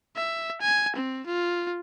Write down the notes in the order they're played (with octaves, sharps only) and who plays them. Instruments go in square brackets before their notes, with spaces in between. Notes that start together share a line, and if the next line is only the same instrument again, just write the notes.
[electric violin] E5
G#5
C4
F4